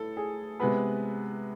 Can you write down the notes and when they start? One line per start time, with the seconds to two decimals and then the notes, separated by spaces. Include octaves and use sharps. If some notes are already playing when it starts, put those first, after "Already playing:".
Already playing: A2 A4
0.17 G#4
0.60 C3 G#3 B3 B4